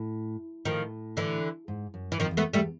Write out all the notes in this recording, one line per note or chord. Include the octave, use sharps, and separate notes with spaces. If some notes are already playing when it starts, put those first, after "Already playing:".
Already playing: A2
A2 D#3 F3
D3 E3
G#2
F#2
E3
F2 D#3 F3
E2
A3 B3
E2 G3 A3